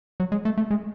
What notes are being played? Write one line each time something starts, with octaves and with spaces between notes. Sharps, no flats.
F#3
G#3
A3
A3
G#3